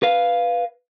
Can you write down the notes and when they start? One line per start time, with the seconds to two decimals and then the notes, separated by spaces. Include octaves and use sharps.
0.03 B4 F5